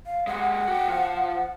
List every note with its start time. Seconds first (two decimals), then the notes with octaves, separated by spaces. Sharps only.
0.06 F5
0.27 G#3 G4 F#5
0.68 F#4 G5
0.88 F3 F4